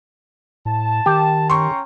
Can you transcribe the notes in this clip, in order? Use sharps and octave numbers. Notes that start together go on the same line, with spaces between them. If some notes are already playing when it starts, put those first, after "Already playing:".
A2 A5
D#3 G4
C#4 G5 A#5 C6 C#6